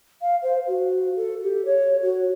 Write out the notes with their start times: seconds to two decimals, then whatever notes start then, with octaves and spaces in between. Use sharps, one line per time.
0.21 F5
0.43 C5
0.67 F#4
1.16 A4
1.42 G4
1.65 C#5
2.02 F#4